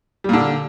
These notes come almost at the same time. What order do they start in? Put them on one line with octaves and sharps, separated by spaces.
G3 A#2 D3